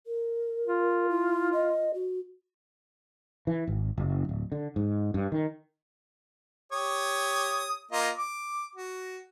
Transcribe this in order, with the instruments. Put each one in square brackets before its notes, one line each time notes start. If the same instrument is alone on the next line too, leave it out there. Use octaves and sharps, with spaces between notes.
[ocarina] A#4
[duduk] F4
[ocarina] E4
D#5
F#4
[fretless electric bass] E3
G#1
F#1
D1
D3
G#2
G2
D#3
[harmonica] G4 C#5 D#6
A#3 F4 D#5
D6
F#4